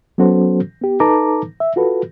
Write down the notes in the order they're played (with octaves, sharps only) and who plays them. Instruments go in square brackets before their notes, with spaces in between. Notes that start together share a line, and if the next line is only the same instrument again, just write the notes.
[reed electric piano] F#3 B3 C#4 F#4 A4 C5
B3 G4
D#4 A4 B4 A5 A#5 D6
E5
F4 F#4 A4 B4